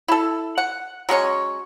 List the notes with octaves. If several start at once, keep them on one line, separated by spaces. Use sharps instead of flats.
E4 A4
F#5
F#3 G#3 C#4 C#5